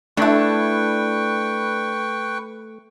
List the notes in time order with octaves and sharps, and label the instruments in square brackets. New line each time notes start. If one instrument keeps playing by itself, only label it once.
[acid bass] A3 [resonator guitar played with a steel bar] D4 E4 [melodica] B4 G5 C#6